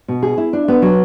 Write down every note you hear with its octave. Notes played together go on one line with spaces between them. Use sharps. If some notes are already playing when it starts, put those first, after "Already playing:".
B2
G#4
E4
D4
B3
F#3